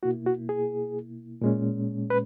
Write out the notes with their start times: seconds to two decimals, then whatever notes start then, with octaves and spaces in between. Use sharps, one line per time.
0.03 B2 A#3 E4 F#4
0.26 F#4
0.49 G#4
1.41 A#2 G#3 C#4
2.10 B4